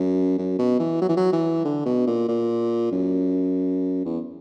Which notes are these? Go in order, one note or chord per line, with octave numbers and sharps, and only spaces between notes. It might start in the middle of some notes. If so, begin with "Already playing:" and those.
Already playing: F#2
F#2
B2
E3
F#3
E3
F#3
E3
D3
B2
A#2
A#2
F#2
E2